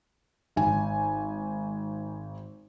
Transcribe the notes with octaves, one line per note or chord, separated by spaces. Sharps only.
G#1 G#5